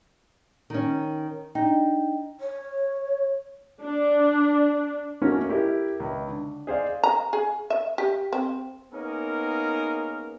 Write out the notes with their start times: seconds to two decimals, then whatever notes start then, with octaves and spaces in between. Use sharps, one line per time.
0.70 D#3 C#4
1.55 D4 D#4 G5
2.40 C#5
3.82 D4
5.22 A3 A#3 C#4 F#4 A#4
5.49 E4 G4 A4 A#4
6.00 C#2
6.28 D3
6.67 G#4 C5 D5 F5
7.03 A#5
7.33 G#4
7.70 E5
7.98 G4
8.33 C4
8.92 A#3 B3 C#4 D#4 G#4 A#4